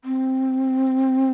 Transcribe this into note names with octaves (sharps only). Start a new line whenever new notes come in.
C4